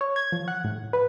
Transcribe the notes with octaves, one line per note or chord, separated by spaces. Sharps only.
C#5
G#6
F3
F#5
A2
B4